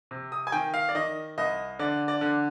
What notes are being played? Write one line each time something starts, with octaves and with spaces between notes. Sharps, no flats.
C3
D#6
G#5
D#3 G5
F5
D5
D#3 D#5
C2 D#5
D3 D5
D5
D3